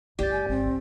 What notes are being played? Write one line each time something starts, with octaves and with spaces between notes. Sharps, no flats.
F#1 G#3 G4 D5 A6
G#5
G#1 C4
E3 E4